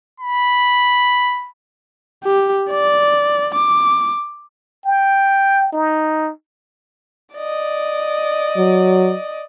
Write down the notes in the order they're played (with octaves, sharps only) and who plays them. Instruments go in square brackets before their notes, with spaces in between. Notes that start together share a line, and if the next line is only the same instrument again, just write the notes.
[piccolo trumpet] B5
[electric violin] G4
D5
D6
[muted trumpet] G5
D#4
[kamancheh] D5 D#5
[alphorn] F#3